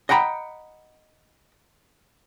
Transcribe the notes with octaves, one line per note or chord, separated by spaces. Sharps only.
D#5 F#5 G5 A#5 B5